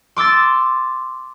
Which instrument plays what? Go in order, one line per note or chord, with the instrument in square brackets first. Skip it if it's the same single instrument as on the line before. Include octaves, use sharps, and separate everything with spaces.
[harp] C6 D6 E6 A6